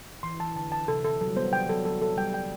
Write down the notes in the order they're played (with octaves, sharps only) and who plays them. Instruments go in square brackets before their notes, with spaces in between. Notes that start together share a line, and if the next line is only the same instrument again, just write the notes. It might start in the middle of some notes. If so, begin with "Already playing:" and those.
[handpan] E3 [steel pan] C6
[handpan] E3 [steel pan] A5
[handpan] D3 [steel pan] A5
[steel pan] A5
[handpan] C3 [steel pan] A4
[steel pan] A4
[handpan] F#3 [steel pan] A4
[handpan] G3
[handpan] B3 [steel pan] C5
[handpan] G3
[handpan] F#3 [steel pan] G5
[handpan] F#3 [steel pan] A4
[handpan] F#3 [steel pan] A4
[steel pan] A4
[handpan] G3 [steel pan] G5
[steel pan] G5